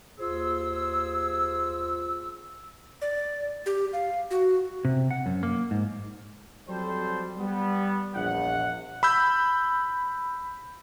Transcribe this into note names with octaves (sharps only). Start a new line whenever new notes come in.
D#2 F4 G#4 C5 E6
D5
G4
F5
F#4
C3
F#5
F#2
A#3
G#2
F2 F#3 G3 A4 C5
G3 B3
A#1 E2 F#5
B5 E6 G6